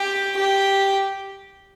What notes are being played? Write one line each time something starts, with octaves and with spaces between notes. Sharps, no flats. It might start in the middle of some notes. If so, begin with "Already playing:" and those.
Already playing: G4
G4